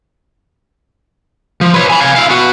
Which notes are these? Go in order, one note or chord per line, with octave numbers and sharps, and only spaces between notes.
F3
B4 C#5
G#5 B5
F5 G#5
E4 F5
B3 F#4